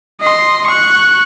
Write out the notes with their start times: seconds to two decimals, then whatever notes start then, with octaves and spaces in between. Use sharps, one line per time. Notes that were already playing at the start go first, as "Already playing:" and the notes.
0.21 D#5 C6
0.67 C#6 F#6